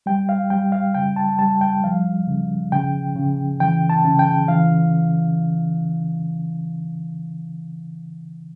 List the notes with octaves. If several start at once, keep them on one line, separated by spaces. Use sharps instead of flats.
G3 G5
F5
G3 G5
F5
C#3 G5
A5
G3 A5
G5
F3 F5
C#3
C#3 G5
C#3
E3 G5
A5
C#3
G5
E3 F5